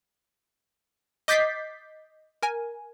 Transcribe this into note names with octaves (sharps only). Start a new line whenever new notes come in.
D#5 D6 G6 A6 B6 C7
A#4 G#5